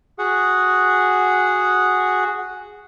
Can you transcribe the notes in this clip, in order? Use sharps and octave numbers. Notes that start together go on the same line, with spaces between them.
F#4 G#4 F#5